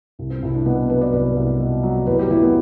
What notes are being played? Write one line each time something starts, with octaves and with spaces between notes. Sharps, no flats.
C2
C4
C2 E4
D4
B2 B3
F#3 B4
D5
C2 B4
C2
B2
F#3
E2 B4
G4
E2 E4
B3